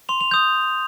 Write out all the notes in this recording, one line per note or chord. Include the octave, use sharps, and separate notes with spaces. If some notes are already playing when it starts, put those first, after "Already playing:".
C6 F7
F7
D#6 G6 F7